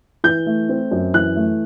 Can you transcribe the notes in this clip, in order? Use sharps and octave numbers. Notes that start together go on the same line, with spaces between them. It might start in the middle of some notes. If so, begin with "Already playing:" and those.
E3 G6
A3
C4
F#2
E3 F#6
A3